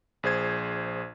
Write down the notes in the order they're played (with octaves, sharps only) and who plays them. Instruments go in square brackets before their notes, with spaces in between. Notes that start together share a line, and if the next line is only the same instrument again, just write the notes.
[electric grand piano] A#1 G#4 C5 G#6